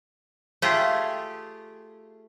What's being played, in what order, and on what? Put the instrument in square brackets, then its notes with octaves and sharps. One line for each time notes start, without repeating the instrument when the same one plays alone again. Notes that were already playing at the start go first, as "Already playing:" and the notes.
[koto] A3 F4 G4 G#4